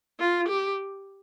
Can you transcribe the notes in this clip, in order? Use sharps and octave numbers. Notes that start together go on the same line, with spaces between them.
F4
G4